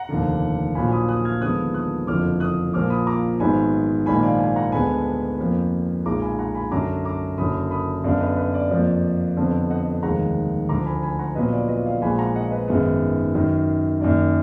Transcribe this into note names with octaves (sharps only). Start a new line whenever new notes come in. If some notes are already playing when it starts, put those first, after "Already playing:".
Already playing: F#5 A#5
F1 D#2 D3
A#1 A#2 F#3 G#5 B5
B5 D#6
D#6 F#6
F6 G#6
D#2 D3 F3 G#3 B3 D#6 F#6
D#6 F#6
F#1 F2 D3 F3 D6 F6
D#6 F#6
A#1 A#2 F3 A#3 D6 F6
B5 D#6
A#5 D6
G#1 G#2 F#3 B3 G#5 B5
A#1 G#2 D#3 A#3 G#5 B5
D5 F5
F5 G#5
F#5 A#5
D2 D3 G#3 B3 G#5 B5
F2 F3 A#3
B1 A#2 G#3 A#5 D6
G#5 B5
F#5 A#5
G#5 B5
F#2 D3 F#3 A#5 D6
A#5 D6
F#1 F#2 D3 F#3 B5 D#6
B5 D#6
F#2 D3 F#3 B3 D5 F5
B4 D#5
B4
D5
F2 F3 A#3
F2 D3 F3 B3
D#5 F#5
F1 D#2 D#3 G#3 F#5 A#5
D2 D3 F3 A#5 D6
G#5 B5
G#5 B5
F#5 A#5
A#1 A#2 F#3 B3 B4 D#5
D5
B4 D#5
D5 F5
A#1 A#2 G#3 G#5 B5
F#5 A#5
D#5 F#5
B4 D#5
G#1 F#2 D#3 G#3 B3
F#2 D#3 F#3
F#2 D#3 A#3 D5